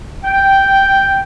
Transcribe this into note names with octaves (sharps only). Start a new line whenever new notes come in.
G5